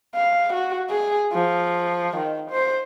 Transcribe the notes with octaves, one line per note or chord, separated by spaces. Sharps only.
F5
F#4
G#4
F3
D#3
C5